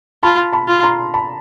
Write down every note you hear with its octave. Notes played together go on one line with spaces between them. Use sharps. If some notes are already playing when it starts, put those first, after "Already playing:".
F4 A5 B5
A5 B5
F4
A#5 C6
A5 B5